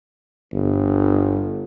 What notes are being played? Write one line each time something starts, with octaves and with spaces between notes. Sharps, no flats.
G1